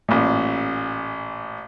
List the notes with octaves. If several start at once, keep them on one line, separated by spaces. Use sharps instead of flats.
A1 A#2